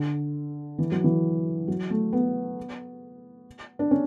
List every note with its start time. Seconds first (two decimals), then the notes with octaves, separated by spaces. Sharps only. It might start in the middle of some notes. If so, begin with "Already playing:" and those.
Already playing: D3
0.78 E3
0.92 F#3
1.04 E3
1.68 F#3
1.90 A3
2.13 B3
3.79 D4
3.91 C#4